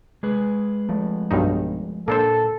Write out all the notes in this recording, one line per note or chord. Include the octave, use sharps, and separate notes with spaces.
G#3 G#4 B4
F3 A3
B1 G2 D#4
A#2 A#3 D4 A4 C5